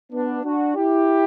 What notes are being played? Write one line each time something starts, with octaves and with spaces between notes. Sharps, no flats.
B3 D4
D4 F#4
E4 G4